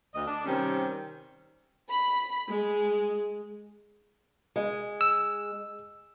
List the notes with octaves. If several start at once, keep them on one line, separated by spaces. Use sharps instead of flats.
D2 D#5
D4
C3 D#3 G3 C4 C#4
B5
G#3
G#3
E6